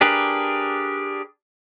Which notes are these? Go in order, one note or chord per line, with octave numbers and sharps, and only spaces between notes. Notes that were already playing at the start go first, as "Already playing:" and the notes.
D4 G4 G#4 A#4 B4